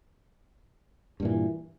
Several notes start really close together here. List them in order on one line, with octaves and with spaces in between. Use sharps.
G2 A#2 E3